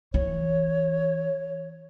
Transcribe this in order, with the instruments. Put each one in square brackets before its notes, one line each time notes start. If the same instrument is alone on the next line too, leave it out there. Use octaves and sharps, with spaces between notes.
[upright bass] E3 [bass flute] C#5